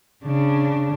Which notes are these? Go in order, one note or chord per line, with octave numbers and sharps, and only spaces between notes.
C#3 D4